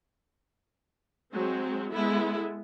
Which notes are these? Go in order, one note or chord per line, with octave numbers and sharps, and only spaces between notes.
F#3 G#3 C4
G#3 B3 E4 A4